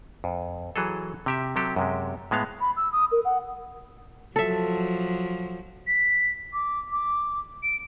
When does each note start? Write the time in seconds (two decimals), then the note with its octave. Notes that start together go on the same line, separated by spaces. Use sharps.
0.24 F2
0.76 E3 F#3 G#4 A4
1.26 C3 G4 E5
1.56 C3 F#3 G4 A4
1.76 F#2 C3 G#3
2.31 A2 G#3 B3 F5
2.61 B5
2.76 E6
2.92 D#6
3.12 A#4
3.25 F#5
4.36 F3 F#3 A4 E5
5.87 B6
6.53 D6
6.92 D6
7.63 D7